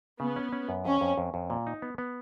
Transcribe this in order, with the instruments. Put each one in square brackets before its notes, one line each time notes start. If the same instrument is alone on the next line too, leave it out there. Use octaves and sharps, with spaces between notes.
[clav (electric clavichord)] C#3 [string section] B3
[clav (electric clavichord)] C#4
C#4
F#2
[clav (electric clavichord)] F2 [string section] C#4
[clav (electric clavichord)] F2
F2
F2
A#2
D#4
B3
B3